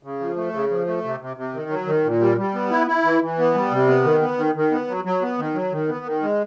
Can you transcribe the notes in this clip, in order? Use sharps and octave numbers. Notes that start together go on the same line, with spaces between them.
C#3
F3
A3
C#3
F3
A3
C3
C3
C3
D#3
F#3
D#3
A#2
G3
G3
B3
E4
E4
E3
E3
B3
G3
C3
B3
D#3
B3
D#3
D#3
B3
F#3
F#3
B3
D#3
F#3
D#3
B3
D#3
G#3